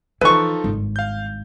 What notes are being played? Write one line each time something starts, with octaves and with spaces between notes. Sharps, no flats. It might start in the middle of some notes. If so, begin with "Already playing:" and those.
E3 F3 D#4 A4 B4 C#6
G#1 G2
F5 G6